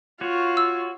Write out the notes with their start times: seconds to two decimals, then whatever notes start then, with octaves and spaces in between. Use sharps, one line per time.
0.21 F4 F#4 C#5
0.57 E6